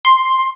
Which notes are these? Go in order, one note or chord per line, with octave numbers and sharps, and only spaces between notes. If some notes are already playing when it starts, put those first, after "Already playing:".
C6